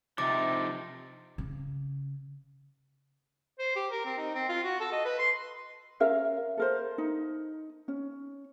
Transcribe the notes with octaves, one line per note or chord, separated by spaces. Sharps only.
C3 F3 D#4 D6 A6
C#3
C5
G4
A#4
C4
D#4
C4
F4
F#4
A4
D#5
B4
C6
C#4 A#4 E5 F5
A4 A#4 C5
D#4
C#4